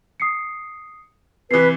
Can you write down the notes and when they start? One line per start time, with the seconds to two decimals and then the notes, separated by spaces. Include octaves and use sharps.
0.20 D#6 C7 C#7
1.51 C3 E3 B4 C7